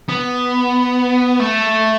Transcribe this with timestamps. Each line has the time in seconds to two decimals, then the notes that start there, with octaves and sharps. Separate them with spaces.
0.09 B3
1.40 A3